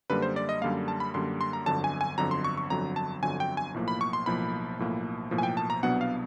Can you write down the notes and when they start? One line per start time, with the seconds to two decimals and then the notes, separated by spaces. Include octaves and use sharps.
0.10 F#2 D3 G3 A#3 B4
0.22 C5
0.36 D5
0.49 D#5
0.61 F#2 D3 G3 A#3 F5
0.88 A5
1.00 B5
1.14 F#2 D3 G3 A#3 C6
1.41 C6
1.53 A#5
1.66 G1 F2 D3 F#3 A5
1.84 G#5
2.01 G#5
2.18 G1 F2 D3 F#3 A#5
2.31 C6
2.44 C#6
2.57 C#6
2.70 G1 F2 D3 F#3 A#5
2.96 A5
3.23 G1 F2 D3 F#3 G#5
3.40 G5
3.57 G#5
3.74 B1 A2 F3 A#3
3.88 B5
4.01 C#6
4.13 C6
4.26 B1 A2 F3 A#3 B5
4.79 B1 A2 F3 A#3
5.31 B1 A2 F3 A#3
5.38 G#5
5.43 G5
5.57 A5
5.70 A#5
5.83 C2 B2 F#3 B3 D4 F#5
6.01 F5